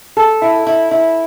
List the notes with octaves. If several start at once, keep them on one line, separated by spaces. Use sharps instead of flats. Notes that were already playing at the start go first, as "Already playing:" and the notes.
A4
E4
E4
E4